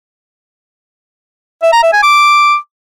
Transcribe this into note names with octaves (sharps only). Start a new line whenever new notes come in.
E5
A#5
E5
G#5
D6